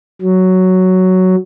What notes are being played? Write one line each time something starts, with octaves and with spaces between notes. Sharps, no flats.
F#3